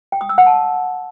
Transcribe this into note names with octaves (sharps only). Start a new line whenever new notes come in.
G5
D#6
E6
F#5
A5